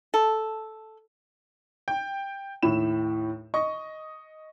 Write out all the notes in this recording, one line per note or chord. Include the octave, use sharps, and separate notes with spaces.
A4
G5
D#2 A2 E4 B5 E7
D#5 C#6